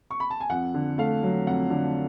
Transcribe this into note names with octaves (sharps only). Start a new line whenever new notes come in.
C#6
B5
A5
G#5
F2 F#5
D3
A3 F5
F#3
F2 F#5
D3